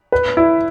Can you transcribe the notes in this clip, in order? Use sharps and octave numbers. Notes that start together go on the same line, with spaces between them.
B4
E4